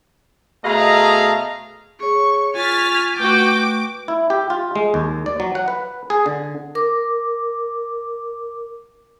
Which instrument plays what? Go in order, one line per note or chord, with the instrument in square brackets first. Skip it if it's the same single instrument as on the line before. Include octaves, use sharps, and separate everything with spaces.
[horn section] B2 A3 G#4 D#5 F5 A#5
[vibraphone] G#4 C#5 [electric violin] C#6
[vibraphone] F4 C#6 [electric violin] G#5 [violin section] F6 A6 B6
[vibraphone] A3 B4 C#6 [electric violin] F#4 G5 [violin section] D6
[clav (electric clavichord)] E4
G4
F4
G#3
D#2
D5
F#3
F#5
B4
G#4
D3
[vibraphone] A#4 D6